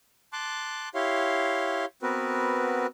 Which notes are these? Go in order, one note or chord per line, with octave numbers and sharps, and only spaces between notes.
A5 C6 D6 F#6
E4 G4 C#5 F5 C6
B3 C4 F#4 A#4 B4